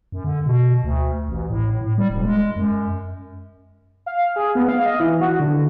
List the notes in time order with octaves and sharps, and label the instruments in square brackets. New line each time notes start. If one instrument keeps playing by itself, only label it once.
[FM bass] F#2
D3
B2
D2
A1
A2
A2
G3
E1
G#3
F#2
[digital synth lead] F5
G#4
B3
F5
D#5
E3
F#4
D3